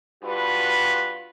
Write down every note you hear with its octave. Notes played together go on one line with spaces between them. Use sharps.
G2 F4 F#4 B4